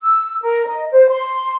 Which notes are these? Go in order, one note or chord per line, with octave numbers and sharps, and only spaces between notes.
E6
A#4
D#5
C5
C6